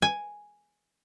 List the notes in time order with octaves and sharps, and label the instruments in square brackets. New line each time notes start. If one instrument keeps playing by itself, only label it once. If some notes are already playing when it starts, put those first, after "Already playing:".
[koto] G#5